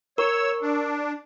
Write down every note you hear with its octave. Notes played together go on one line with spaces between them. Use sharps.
A#4 C#5 C#6 E6
D4